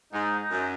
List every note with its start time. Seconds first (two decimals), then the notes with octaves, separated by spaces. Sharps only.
0.13 G#2 D#4
0.39 D#4
0.51 F#2